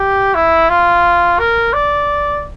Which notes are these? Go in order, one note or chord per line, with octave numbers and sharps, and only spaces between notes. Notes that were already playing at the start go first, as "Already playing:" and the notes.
Already playing: G4
E4
F4
A#4
D5